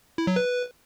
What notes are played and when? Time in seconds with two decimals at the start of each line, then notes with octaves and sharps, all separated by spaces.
0.18 E4
0.27 F#3
0.36 B4